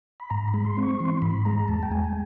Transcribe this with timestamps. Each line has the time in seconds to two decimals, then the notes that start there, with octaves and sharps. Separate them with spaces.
0.20 B5
0.30 G#2 A#5
0.48 B5
0.54 G#3
0.65 C6
0.77 C4
0.83 C#6
0.99 E3 C6
1.22 G#2 B5
1.45 G#3 A#5
1.68 E2 A5
1.83 G5
1.91 G#3 G#5
2.04 G#5